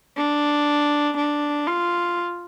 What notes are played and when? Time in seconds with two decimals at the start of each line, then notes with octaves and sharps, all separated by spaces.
0.17 D4
1.17 D4
1.67 F4